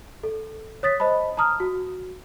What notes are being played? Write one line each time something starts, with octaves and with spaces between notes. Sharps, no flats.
A4
C#5 D#6 A6 B6
C5 D#5 A5 B5
A5 A#5 D#6 F6
F#4